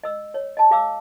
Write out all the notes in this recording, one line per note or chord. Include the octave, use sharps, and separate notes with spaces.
D#5 E6
C#5
D#5 A5
G#4 F5 D6 E6